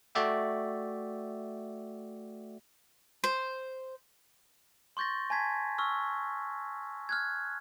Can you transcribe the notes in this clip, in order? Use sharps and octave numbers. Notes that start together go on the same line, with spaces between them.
A3 F#4 D5 E5 G5
C5
C6 C#6 G6 A6 A#6
G#5 A5 G#6 B6
C#6 E6 F6
F6 F#6 G#6